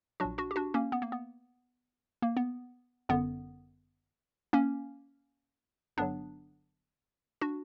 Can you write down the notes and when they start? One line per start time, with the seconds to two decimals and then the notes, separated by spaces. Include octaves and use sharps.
0.20 A#1 A#2 F#3 D4 F#4
0.38 D4 F#4
0.51 G4
0.56 D4 F#4
0.74 A#3 C#4
0.92 B3
1.02 A#3
1.12 B3
2.22 A#3
2.37 B3
3.09 G1 F#2 D3 B3
4.53 A#3 C#4
5.97 G1 G2 D3 F#3 B3 D4
7.41 D4 F#4